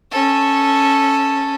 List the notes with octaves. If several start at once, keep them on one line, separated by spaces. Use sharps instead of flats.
C#4 A4